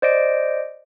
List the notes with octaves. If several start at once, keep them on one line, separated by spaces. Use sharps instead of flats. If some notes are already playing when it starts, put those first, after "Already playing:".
C5 D5 D#5 D7